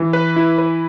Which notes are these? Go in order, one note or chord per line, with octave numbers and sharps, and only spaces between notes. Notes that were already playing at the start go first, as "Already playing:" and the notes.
Already playing: E3
B4
E4
B4